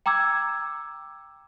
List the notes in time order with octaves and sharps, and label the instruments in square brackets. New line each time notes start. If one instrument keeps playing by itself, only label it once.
[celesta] G5 A#5 D6 E6 G#6